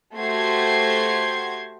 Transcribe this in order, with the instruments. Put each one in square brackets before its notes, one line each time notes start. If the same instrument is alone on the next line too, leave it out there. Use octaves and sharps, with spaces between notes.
[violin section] A3 F#4 G4 C5 G#6 C7